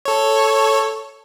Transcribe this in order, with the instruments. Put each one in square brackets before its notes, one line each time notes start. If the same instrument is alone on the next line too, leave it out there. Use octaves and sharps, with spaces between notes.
[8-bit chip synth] A4 C#5